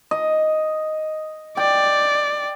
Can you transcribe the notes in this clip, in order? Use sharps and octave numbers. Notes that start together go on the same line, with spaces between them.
D#5
D5 G5